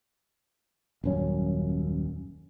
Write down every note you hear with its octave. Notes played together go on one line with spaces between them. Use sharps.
D#1 F#2 C#4